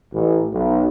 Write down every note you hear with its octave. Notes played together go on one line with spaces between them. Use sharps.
A1
B1